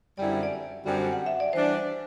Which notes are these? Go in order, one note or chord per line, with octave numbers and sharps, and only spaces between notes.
F#2 D3 G3 C4 E4 D5
E5
D5
F#2 D3 G3 C4 F#4
F#5
E5
D5
E3 G3 D4 C5